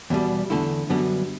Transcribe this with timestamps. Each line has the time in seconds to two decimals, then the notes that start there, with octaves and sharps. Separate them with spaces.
0.10 E2 B2 G3
0.50 E2 D3 A3 E4
0.90 F#2 D3 G3 B3